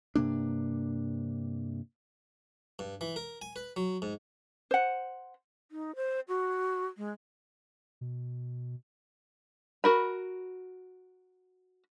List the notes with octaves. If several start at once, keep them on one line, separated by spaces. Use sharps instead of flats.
G2 C3 A#3 D4
G2
E3
A#4
G#5
B4
F#3
G#2
C5 F#5
D#4
C5
F#4
G#3
B2
F#4 A#4 B5